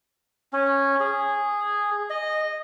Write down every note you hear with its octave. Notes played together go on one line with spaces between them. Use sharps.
C#4
G#4
D#5